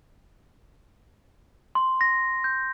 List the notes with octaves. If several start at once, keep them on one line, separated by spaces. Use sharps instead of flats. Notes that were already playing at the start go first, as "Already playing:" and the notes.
C6
A#6
G6